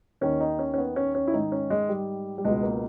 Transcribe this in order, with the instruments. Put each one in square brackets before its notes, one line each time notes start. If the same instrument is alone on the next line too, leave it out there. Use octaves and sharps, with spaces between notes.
[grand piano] D#2 D#3 C#4
D#4
C#4
C#4
B3
C#4
C#4
E4
G#2 D#3 D#4
C#4
G#3
G3
G3
C#2 B2 G#3
A#3